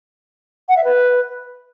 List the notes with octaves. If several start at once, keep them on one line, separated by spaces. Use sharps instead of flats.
F#5
E5
B4